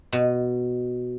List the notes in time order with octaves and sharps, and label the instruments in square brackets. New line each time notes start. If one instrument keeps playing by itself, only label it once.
[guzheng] B2